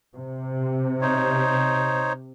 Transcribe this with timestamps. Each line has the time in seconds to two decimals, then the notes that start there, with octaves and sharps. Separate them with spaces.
0.16 C3
1.01 D#4 C5 C#5